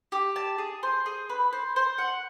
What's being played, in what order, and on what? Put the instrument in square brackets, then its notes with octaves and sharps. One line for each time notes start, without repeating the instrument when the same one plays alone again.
[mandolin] G4
A5
G#4
C5
G#4
B4
C5
C5
F#5